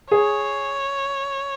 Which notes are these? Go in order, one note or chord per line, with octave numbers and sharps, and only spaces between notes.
G#4 C#5